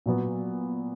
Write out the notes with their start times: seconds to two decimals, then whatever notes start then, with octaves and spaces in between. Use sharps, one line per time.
0.06 A#2 F#3 B3